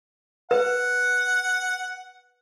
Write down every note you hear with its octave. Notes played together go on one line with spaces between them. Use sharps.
B4 F#5